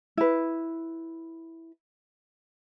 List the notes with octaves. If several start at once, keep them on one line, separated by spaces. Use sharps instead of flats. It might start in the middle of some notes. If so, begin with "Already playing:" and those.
E4 B4